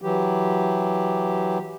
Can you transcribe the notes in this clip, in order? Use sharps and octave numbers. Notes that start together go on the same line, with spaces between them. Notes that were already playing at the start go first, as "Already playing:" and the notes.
E3 F#3 G4